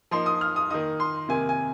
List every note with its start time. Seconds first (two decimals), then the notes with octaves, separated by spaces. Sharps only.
0.11 F3 A#3 D#4 C6
0.26 D#6
0.41 F6
0.56 D#6
0.70 D#3 A#3 D#4 D#6
1.00 C6
1.29 C3 D#3 A#3 G#5
1.49 G#5